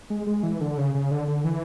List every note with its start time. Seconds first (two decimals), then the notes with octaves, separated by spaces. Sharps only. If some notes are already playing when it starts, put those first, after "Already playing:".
0.10 G#3
0.27 G#3
0.43 E3
0.61 D3
0.77 C#3
0.95 C#3
1.11 D3
1.28 D3
1.44 E3